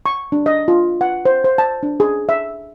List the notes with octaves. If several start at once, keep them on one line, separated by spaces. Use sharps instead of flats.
C#6
D4
D#5
F4
F#5
C5
C5
A5
D4
G#4
E5